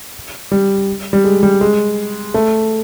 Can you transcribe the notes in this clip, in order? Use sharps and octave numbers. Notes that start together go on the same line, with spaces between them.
G3
G3
G#3
G3
G#3
A3